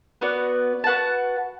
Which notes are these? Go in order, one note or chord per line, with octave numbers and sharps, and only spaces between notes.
B3 F#4 B4 D5
F#4 B4 F#5 A5